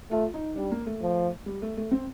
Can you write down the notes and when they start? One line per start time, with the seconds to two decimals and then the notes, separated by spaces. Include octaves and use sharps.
0.11 A3 F4
0.34 D#4
0.56 G3 D4
0.71 A#3
0.86 A3
1.02 F3
1.46 G3
1.62 A3
1.77 A3
1.91 C4